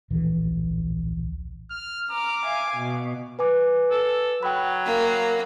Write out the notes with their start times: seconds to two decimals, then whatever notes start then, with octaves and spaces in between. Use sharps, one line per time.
0.10 D1 A#1 E3
1.70 F6
2.11 A#5 D6 F6
2.44 E5 F5 G#5
2.76 B2
3.39 B4 G#5 D6
3.91 A4
4.43 F#3 G5 B5
4.86 A#3